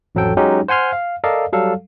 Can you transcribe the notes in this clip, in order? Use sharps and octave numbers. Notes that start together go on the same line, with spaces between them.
A1 F2 F#3 C4 A4 G5
F#3 G#3 C#4 D#4 G4
C5 F#5 G#5 C6 F6
F5
A4 A#4 D5 D#5 F5
F#3 G3 A4 F5